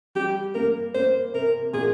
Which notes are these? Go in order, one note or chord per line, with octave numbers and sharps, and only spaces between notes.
G3 G4
A#3 A#4
A#3 C5
C3 A#4
A#2 G#4